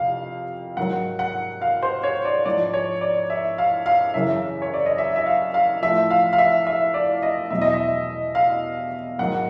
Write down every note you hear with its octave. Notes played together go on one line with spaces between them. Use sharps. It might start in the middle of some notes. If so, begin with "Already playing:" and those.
Already playing: F2 C3 F5
G#2 D#3 F#3 F#5
F#5
F5
C5
C#5
D5
G#2 F3 D5
C#5
D5
E5
F5
F5
F#2 C#3 E3 E5
C#5
D5
D#5
E5
E5
F5
F5
A2 F3 E5
F5
F5
E5
E5
D5
D#5
E2 B2 F#3 E5
D#5
E5
F5
G#2 D#3 F#3 F#5